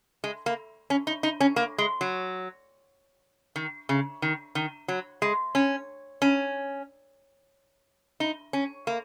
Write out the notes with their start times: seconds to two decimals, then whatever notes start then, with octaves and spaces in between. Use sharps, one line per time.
0.24 G#3
0.46 A#3
0.90 C#4
1.07 D#4
1.23 D#4
1.40 C#4
1.56 A#3
1.78 G#3
2.01 F#3
3.56 D#3
3.89 C#3
4.22 D#3
4.55 D#3
4.88 F#3
5.22 G#3
5.55 C#4
6.22 C#4
8.20 D#4
8.53 C#4
8.87 A#3